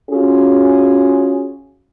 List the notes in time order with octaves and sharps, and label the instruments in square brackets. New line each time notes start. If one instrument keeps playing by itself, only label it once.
[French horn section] C#4 F4 F#4 G#4